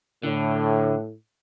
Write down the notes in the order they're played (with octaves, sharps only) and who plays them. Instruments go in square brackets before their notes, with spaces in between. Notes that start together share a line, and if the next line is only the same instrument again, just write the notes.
[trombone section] A2 [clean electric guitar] D3